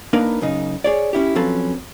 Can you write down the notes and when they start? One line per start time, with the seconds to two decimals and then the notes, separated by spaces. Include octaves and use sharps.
0.13 A#3 D4 D#4 A#4 B4
0.41 F#2 C#3 D#4
0.84 G#4 C#5 D5
1.13 C#4 E4 G4
1.35 F3 F#3 C4 C#4 A4 B4